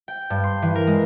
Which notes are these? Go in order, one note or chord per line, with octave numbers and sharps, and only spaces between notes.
G5
G2
C6
E3
A#4
G#3